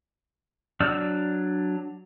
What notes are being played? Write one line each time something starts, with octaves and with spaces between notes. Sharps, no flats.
F#3 D4 D5 E6 F6